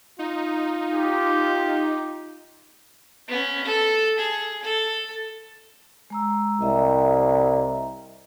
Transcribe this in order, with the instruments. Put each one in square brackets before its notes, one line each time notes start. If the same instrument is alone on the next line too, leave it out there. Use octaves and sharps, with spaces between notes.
[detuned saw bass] D#4 [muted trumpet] F4
[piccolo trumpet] G4
[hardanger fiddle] B3 C#4
A4
G#4
A4
[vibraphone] G#3 A#5 E6
[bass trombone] C2 [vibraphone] D#5 E5 A#5